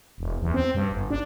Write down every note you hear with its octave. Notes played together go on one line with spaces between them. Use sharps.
E1
E2
C4
G2
G1
D4